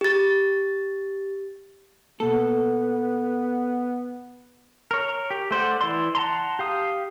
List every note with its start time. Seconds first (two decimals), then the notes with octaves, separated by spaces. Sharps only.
0.01 G4 A6
2.20 B2 A#3 B3 A4
4.91 A#4 C#5
5.31 G4
5.51 A3 C5 D5 F#5
5.81 E3 E4 D5 C6
6.15 F#5 A5 A#5 C6
6.59 G4 F5 D#6